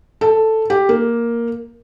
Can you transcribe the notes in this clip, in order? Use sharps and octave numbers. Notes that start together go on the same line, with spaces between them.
A4
G4
A#3